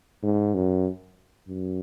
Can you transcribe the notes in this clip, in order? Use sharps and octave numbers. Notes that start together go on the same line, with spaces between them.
G#2
F#2
F#2